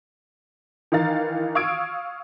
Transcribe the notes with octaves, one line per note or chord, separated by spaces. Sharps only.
D#3 E3 D#4 F5 A6
F5 C#6 D#6 E6 G#6 D7